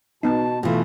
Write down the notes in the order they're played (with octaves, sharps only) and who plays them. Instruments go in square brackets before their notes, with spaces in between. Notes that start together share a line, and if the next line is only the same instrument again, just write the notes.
[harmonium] B2 A5 [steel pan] B3 D#4
[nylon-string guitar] B2 E3 [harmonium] A3 F4 [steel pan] G4